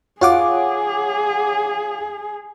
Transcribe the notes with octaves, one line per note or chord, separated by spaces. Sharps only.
F4 G#4 C#5 F#5 D6